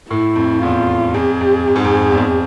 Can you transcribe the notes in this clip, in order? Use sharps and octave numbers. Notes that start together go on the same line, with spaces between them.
A2 E4
F2
E2 F4
F2 G#4
F2
F2
G#2
F2
E2
F2